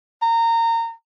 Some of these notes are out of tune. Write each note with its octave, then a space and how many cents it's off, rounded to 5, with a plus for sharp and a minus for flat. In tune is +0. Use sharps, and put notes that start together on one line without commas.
A#5 -25